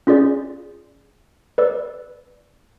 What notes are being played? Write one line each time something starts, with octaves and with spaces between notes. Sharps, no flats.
C#4 F4 G#4 D5
B4 D5 E6